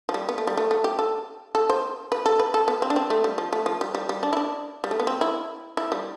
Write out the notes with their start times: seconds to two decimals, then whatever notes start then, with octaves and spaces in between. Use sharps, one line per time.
0.09 F3
0.14 G3
0.29 B3
0.38 A3
0.47 G3
0.57 A3
0.71 A3
0.84 G4
0.99 A4
1.55 A4
1.70 C5
2.12 B4
2.26 A4
2.39 B4
2.54 A4
2.68 B3
2.82 C4
2.90 D4
2.96 C4
3.10 A3
3.24 G3
3.38 F3
3.53 A3
3.66 F3
3.81 G3
3.95 G3
4.09 G3
4.23 D4
4.33 E4
4.37 D4
4.84 G3
4.91 A3
5.00 B3
5.07 C4
5.21 E4
5.77 E4
5.92 G3